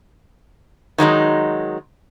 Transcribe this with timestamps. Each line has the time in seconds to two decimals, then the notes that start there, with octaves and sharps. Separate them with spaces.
0.98 D#3 F#3 G#3 D#4